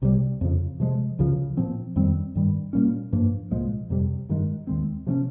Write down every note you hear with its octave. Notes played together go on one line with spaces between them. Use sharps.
C2 C3 G3
F2 C#3 F3
C3 F3 G#3
C#2 C#3 F3
A#2 F3 C4
F2 D#3 G3 C4
G2 D#3 G3
A#2 G3 A#3 C#4
G2 F3 A#3
C2 A#2 F3 G#3
F2 C3 G3
G2 D#3 G#3
D#2 D#3 G#3 C4
C3 F3 A#3 C#4